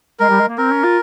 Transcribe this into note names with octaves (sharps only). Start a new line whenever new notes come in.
G#3 A#4
G3
G#3
A#3
C4 A#4
C#4
F4